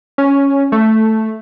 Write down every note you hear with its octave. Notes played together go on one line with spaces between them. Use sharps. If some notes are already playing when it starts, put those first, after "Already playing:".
C#4
A3